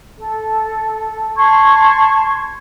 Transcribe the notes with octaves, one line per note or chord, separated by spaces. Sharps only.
A4
A5 C6 C#6 G#6